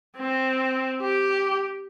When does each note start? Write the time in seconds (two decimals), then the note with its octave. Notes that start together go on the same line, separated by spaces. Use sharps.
0.17 C4
1.02 G4